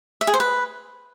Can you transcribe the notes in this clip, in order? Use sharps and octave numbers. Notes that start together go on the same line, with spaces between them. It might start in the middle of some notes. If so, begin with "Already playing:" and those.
E5
G#4
C5
B4